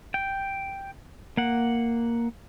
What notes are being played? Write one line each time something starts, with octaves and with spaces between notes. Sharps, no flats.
G5
A#3 F#5